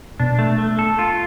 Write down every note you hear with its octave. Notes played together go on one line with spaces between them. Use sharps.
B2 D4
A3
A3
A4
F4